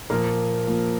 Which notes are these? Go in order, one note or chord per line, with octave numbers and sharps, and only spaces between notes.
A#2 F3 A#3
A#2 F3